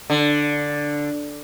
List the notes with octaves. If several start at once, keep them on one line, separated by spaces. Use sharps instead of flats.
D3